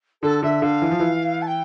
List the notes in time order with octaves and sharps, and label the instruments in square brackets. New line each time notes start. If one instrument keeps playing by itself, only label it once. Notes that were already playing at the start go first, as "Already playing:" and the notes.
[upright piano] D3 [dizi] A4
[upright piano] D3 [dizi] E5
[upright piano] D3 [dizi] F5
[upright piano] E3
F3
E3
[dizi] A5
G5